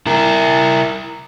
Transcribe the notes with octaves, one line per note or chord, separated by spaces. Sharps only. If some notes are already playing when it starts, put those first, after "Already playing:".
E4 A#4